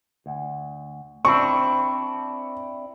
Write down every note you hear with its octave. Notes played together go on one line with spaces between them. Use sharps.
D2
C4 D4 E4 C#6